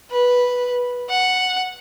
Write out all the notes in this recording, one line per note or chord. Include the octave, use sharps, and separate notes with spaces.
B4
F#5